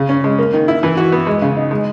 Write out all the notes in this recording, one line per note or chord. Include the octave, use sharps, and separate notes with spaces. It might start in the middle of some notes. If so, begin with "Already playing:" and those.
Already playing: C#3
C#4
G#3
A#3
D#3
E4
E3
F#4
B3
G#3
C#3
D#4
G#3